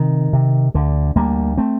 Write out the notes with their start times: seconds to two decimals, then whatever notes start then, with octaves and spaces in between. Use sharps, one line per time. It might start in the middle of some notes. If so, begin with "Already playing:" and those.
Already playing: C3 D#3
0.33 C3
0.74 D2 D3
1.16 D2 G3 A#3
1.58 A3 C4